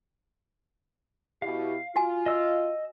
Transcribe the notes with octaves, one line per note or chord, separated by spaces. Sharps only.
B2 E4 G4 F5
F4 F#4 G#5
D#5 E6